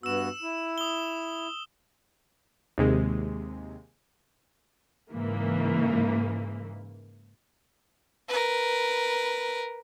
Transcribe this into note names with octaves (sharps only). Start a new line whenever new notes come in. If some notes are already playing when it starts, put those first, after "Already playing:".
G2 B3 F#4 E6 E7
E4
D#6 G7
D#2 C3 G#3
G#2 C#3 E3 A#3
A#4 B4